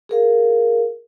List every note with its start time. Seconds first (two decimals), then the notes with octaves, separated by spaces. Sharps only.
0.09 G#4 A#4 F5